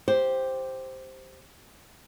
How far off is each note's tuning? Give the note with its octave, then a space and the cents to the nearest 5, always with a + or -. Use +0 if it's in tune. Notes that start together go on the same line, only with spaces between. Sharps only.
G4 +0 C5 +0